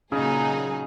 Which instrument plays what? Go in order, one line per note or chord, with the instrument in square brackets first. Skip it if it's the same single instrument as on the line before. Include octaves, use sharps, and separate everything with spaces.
[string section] A#2 F#3 D#4 G#4 [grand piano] C#3